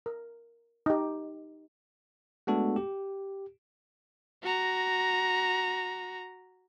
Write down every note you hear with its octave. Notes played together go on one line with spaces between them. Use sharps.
A#4
D#4 G4
G#3 A3 B3 D4 F#4 A4
G4
F#4 A#5